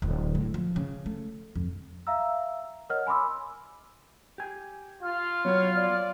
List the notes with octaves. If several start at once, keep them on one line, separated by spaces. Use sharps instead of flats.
D1
A2
F3
C#3
A3
F2
E5 F5 A#5 E6
A#4 C#5 D#5 F#5 F6
G#5 B5 C6 D6 E6
G4 G#5
F4 F6
F#3 B3 C#5
D5